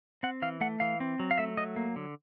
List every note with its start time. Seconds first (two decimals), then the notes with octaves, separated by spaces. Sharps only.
0.23 C4 F#5
0.42 E3 F5
0.61 A3 F#5
0.80 E3 F5
1.00 C4
1.20 F#3
1.31 F5
1.38 A3 E5
1.57 F#3 D#5
1.76 A#3
1.96 D3